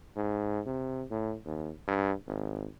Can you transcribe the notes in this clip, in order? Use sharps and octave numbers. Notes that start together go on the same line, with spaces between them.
G#2
C3
A2
D#2
G2
G#1